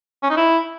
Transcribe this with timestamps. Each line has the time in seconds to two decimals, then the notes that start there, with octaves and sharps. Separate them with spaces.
0.23 C#4
0.30 D#4
0.37 E4